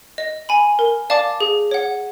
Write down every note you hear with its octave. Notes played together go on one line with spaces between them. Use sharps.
D#5
G#5 B5
A#4
D5 F5 A5 D6
G#4
C#5 F#5